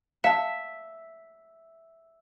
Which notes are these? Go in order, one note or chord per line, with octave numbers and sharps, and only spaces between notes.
E5 F5 A5